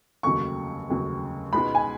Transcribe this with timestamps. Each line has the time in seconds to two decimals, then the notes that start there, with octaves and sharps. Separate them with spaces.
0.23 F1 D#2 C#3 F#3 C#6
0.89 F1 D#2 C#3 F#3
1.53 C#2 B2 G#3 B3 D#4 B5
1.75 G#5